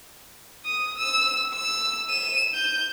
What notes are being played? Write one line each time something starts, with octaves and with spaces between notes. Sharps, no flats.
D#6
E6
E6
D#7 E7
G6